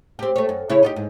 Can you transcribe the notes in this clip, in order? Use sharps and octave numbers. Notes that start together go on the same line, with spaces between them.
C4 G4
A3 C#5
F#2
C#3 E4 C#5
D#4 F4 G4
G#2